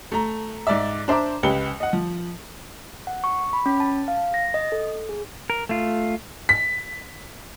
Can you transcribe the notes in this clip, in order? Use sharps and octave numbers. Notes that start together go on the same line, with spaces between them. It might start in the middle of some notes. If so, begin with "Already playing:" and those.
A3 A#5
G#2 D5 E5
D4 C5 E5 A#5 D6
C#2 G4 B4 C#7 G7
D#5 F#5
F3
F#5
C#6
B5
C#4
A5
F5
A#6
D#5
A4
G#4
A#4
A3 F4
B6